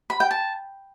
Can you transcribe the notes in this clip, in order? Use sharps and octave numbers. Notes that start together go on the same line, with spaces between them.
B5
G5
A5